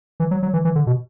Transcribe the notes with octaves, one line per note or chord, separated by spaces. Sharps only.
E3
F#3
F#3
E3
E3
D3
B2